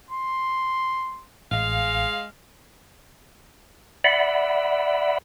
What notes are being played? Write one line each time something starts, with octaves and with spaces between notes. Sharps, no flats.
C6
A1 G#3 F5
D5 E5 F#5 B5